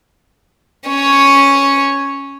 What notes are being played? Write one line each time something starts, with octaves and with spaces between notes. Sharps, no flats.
C#4 C#5